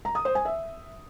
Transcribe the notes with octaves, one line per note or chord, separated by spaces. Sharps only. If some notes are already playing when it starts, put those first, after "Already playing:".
A#5
D#6
C5
G#5
E5